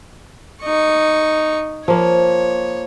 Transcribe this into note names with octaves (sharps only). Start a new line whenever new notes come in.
D#4 C#6
F3 A#3 C#5